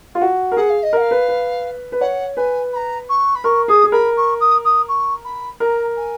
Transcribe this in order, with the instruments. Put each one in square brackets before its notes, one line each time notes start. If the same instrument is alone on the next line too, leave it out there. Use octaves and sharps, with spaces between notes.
[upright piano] F4
F#4
A#4
[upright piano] G#4 [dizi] F#5
[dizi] F5
D#5
[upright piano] A#4 [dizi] F#5
[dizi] F5
[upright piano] B4
B4
B4
[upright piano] C#5 [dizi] F#5
[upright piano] B4 [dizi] G#5
[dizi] B5
A#5
C#6
B5
[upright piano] A#4 [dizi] C#6
[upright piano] G#4 [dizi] D#6
[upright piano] G#4
[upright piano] A#4 [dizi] B5
[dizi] C#6
D#6
D#6
C#6
B5
[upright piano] A#4 [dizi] A#5
[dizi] G#5